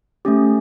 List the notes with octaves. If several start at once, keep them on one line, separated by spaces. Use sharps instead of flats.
A3 C#4 G4